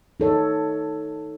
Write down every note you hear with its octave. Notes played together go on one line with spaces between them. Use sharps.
D#4 A4 C#5